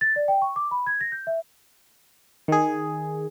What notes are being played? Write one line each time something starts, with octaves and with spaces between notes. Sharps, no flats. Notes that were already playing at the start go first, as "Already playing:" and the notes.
A6
D5
G5
C#6
D6
B5
G#6
A#6
G6
E5
D#3 G#4